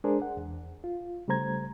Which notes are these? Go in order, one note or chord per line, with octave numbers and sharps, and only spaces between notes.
G#3 D4 G#4 A#4 C5
F#5
E2
F4
C#3 G3 A3 C5 A#5 G#6